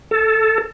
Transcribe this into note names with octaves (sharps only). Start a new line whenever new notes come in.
A4